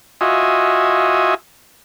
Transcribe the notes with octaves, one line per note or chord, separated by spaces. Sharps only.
F4 F#4 D#5 E5 G#5